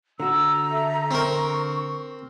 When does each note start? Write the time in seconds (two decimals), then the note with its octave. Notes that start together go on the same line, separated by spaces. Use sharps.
0.20 D3 F#4 A#5 E6
0.70 A4 E5
1.11 C4 A#4 C#6